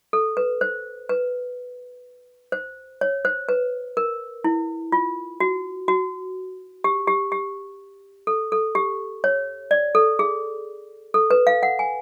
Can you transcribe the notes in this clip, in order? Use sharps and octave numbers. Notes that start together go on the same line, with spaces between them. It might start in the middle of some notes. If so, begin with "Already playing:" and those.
A4
B4
C5
B4
C5
C#5
C5
B4
A#4
E4
F4
F#4
F#4
G4
G4
G4
A4
A4
G4
C#5
D5
A4
G#4
A4
B4
F5
F#5
G#5